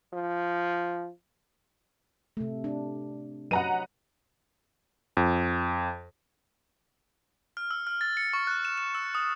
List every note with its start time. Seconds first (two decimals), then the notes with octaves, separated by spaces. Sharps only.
0.13 F3
2.37 C3 A3
2.64 D4
3.51 F#3 B4 D#5 F#5 A#5 D#7
5.17 F2
7.57 F6
7.71 E6
7.87 F6
8.01 A6
8.17 C#7
8.33 C#6
8.47 F#6
8.65 E7
8.78 E7
8.95 E6
9.15 D#6